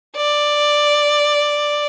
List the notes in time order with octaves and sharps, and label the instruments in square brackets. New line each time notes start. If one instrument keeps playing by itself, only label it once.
[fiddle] D5